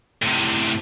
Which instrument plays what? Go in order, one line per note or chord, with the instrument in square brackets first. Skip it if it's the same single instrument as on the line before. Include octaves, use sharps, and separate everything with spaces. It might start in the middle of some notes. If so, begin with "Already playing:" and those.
[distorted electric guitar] A2 C3